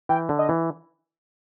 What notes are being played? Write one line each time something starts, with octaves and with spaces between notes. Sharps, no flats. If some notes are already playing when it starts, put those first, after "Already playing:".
E3 G5
D3
D#5
E3